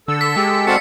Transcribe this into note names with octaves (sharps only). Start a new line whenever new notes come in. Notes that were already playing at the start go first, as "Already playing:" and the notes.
D3 A4 E6
B6
G#3 G4
C4 F#4 A4 D5 F5 A5 C#7